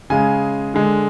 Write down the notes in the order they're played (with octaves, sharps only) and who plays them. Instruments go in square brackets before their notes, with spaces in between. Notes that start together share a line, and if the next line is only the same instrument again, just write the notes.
[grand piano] C#3 G#3 G#5
D3 G#3